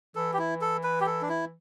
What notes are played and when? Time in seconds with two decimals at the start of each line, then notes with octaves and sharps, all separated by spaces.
0.15 E3 A4
0.33 G4
0.39 E4
0.61 A4
0.84 B4
1.01 G4
1.06 A4
1.21 D4
1.29 E4